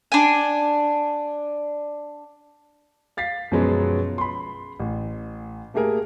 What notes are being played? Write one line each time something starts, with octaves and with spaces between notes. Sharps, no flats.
D4 G#5
F5 A6 B6 C7
F#2 B2 F3 F#3 G#3 B3
B5 C6
A1
A3 A#3 G4 G#4 A#4